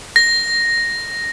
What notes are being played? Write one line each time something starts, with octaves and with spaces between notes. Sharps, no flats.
A#6